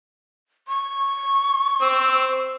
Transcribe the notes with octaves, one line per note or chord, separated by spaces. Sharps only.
C#6
C4 E6